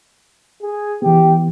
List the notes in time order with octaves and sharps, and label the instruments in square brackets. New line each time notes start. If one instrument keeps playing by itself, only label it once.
[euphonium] G#4
[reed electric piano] E3 B3 [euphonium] G4